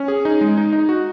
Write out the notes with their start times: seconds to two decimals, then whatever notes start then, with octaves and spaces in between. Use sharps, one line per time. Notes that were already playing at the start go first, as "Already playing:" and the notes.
Already playing: C#4
0.08 G#4
0.25 D#4
0.41 G#3
0.57 D#4
0.73 D#4
0.89 F#4